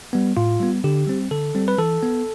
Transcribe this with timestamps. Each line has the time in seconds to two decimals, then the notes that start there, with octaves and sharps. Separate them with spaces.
0.13 G3 B3
0.37 A2 F4
0.60 G3 B3
0.84 D3 G4
1.07 G3 C4
1.31 D3 A4
1.55 G3 C4
1.68 B4
1.78 E3 A4
2.03 B3